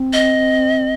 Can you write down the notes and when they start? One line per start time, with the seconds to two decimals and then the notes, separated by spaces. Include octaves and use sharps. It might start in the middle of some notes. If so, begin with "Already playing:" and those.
Already playing: C4
0.13 D#5